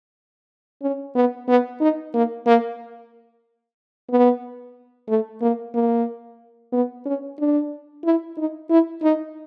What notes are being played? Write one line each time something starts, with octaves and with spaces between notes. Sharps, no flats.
C#4
B3
B3
D#4
A#3
A#3
B3
A3
A#3
A#3
B3
C#4
D4
E4
D#4
E4
D#4